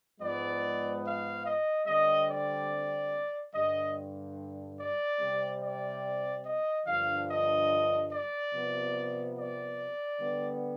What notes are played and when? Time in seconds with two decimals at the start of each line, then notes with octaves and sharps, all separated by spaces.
0.20 G#2 F3 G#3 B3 D5
1.04 F5
1.45 D#5
1.87 D3 G3 C4 D#5
2.29 D5
3.54 G2 D3 G3 D#5
4.79 D5
5.20 C3 G3 C4
5.62 D5
6.45 D#5
6.86 G2 D3 F3 F5
7.28 D#5
8.11 D5
8.53 C3 F3 B3
9.36 D5
10.20 D3 G3 B3